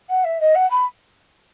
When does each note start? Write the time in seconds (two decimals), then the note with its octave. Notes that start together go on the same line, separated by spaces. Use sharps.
0.09 F#5
0.24 E5
0.40 D#5
0.55 F#5
0.70 B5